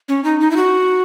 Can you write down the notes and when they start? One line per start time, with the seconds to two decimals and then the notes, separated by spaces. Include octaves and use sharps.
0.09 C#4
0.24 D#4
0.40 D#4
0.51 E4
0.56 F#4